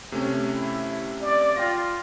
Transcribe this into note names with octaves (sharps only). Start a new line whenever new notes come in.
C3 A3 C#4
E4
D5
F4 G5 A#6